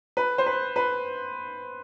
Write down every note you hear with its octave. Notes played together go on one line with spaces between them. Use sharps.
B4
C5
B4
B4